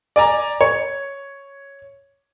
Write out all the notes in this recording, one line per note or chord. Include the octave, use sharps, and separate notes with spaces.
D5 G#5 A#5
C#5